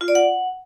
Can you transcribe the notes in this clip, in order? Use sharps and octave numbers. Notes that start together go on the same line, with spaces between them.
F4
D5
F#5